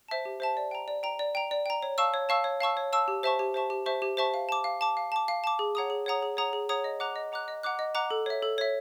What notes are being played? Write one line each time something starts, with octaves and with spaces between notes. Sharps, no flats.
C5 E5 A5
G4
C5 E5 A5
D5
G5 A#5
D5
G5 A#5
D5
G5 A#5
D5
G5 A#5
C#5
F5 A5 C#6 E6
C#5
F5 A5 C#6 E6
C#5
F5 A5 C#6 E6
C#5
F5 A5 C#6 E6
G4
C5 E5 A5 C#6
G4
C5 E5 A5 C#6
G4
C5 E5 A5 C#6
G4
C5 E5 A5 C#6
F5
A5 D6
F5
A5 D6
F5
A5 D6
F5
A5 D6
G#4
C#5 F#5 A#5 D#6
G#4
C#5 F#5 A#5 D#6
G#4
C#5 F#5 A#5 D#6
G#4
C#5 F#5 A#5 D#6
D#5
F#5 A#5 D6 F#6
D#5
F#5 A#5 D6 F#6
D#5
F#5 A#5 D6 F#6
D#5
F#5 A#5 D6 F#6
A4
C#5 E5
A4
C#5 E5